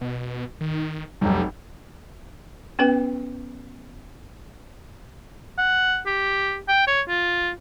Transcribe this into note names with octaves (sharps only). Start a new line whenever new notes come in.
B2
D#3
F1 B1 G3
B3 C#4 B4 G5
F#5
G4
G5
C#5
F4